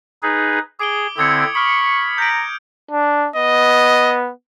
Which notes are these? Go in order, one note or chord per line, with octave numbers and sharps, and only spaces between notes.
D#4 G#4 B4
G#4 D6 D7 G7
D3 C4 E4 D#6 G#6 C#7
B5 C#6 D#6 F6 G7
A#5 G6 D7
D4
B3 D#5